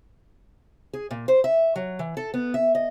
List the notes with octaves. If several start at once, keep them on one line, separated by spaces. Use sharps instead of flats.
G#4
A#2
C5
E5
F#3
E3
A4
B3
E5
D#5